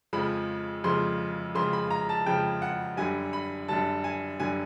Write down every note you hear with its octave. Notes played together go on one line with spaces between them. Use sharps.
F2 C#3 F3 G#3 B5
F2 C#3 F3 G#3 C6
F2 C#3 F3 G#3 C6
B5
A#5
A5
F2 C#3 F3 G#3 G5
F#5
F#2 D3 G3 G#5
B5
F#2 D3 G3 A5
G#5
F#2 D3 G3 G#5